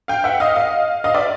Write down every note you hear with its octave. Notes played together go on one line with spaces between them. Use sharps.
F5 G5
E5 F#5
D#5 F5
D#5 F5
D#5 F5
D5 E5